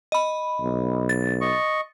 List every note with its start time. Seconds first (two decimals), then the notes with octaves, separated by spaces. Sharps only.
0.12 D#5 B5
0.61 B1
1.09 A6
1.41 D#5 C#6